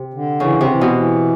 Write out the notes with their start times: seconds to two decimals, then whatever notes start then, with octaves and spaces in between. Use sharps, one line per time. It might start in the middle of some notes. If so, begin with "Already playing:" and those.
Already playing: C3
0.14 D3
0.40 C#3 E3
0.61 C3
0.68 E3
0.81 B2
0.95 E3